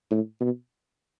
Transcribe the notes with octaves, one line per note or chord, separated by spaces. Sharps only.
A2
B2